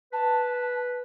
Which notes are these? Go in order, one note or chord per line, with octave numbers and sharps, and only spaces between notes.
B4 A5